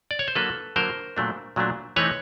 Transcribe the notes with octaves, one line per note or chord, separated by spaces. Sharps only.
D5
C#5
C5
D3 F#3 A#3 A4 B4
D3 F#3 A#3 A#4 C5
A#2 F#3 A3 D4
A#2 F#3 A3 D4
E3 A3 C4 D#4 B4 C#5